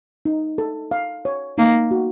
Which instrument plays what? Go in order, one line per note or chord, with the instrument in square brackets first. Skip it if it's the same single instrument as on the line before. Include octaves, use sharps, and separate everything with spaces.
[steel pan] D#4
A4
F5
C#5
[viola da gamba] A#3 [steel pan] D#4
[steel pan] F#4